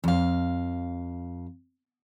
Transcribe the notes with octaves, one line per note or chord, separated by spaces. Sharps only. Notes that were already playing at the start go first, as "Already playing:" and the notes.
F2 F5